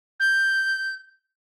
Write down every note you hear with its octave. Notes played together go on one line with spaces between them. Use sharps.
G6